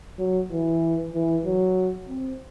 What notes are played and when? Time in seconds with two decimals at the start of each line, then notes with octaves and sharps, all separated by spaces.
0.19 F#3
0.51 E3
1.14 E3
1.45 F#3
2.08 C4